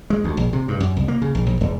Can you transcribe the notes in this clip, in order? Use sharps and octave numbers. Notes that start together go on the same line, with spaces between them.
G#3
D2
A#1
C3
G2
F#2
C2
A#3
C#3
A#1
A#1
E1